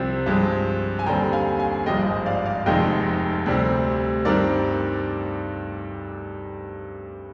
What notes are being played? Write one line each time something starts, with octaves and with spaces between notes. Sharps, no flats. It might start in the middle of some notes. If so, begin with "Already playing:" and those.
Already playing: C2 C3 F3 C4
G2 F3 G#3 C4
G#5
D#2 D3 G3 C4 G5 A#5
F5 G#5
F5 G#5
G#1 G2 F3 G#3 D#5 G5
C5 D#5
D5 F5
D5 F5
F1 F2 C3 D#3 G#3 D#5 G5
D2 C3 G3 C4
G2 D#3 G3 C4 A#4 D5